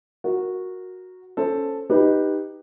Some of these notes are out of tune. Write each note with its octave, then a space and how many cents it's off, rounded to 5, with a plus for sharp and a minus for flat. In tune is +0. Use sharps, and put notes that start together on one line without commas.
F#4 -10 A#4 +0
C#4 +0 A4 +0 C5 +0
D#4 +0 G4 +5 B4 -5